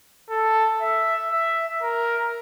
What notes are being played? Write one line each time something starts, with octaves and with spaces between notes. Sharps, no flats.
A4
E5
E5
A#4